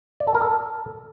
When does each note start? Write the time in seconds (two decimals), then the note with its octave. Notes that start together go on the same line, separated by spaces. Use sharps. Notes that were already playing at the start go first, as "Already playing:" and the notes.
0.20 D5
0.27 A4
0.35 A#4
0.42 A4